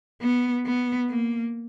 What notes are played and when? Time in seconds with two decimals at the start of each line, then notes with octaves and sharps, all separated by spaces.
0.22 B3
0.66 B3
1.09 A#3